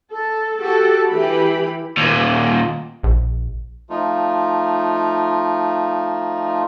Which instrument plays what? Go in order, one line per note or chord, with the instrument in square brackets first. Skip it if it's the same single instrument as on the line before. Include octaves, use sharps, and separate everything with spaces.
[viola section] A4
F#4 G4 A4
E3 G4 B5
[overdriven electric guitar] D#2 A#2
[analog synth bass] A#1
[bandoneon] F3 A3 D#4 F4